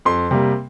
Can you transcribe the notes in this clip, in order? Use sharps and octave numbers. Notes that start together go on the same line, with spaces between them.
F2 C6
C3 G3 A#3